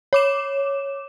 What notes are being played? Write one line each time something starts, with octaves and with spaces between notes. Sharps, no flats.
C#5 D6 E7